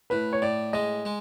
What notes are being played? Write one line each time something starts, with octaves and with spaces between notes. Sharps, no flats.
A2 B4
C#5
A2 D5
G#3 D#5
G#3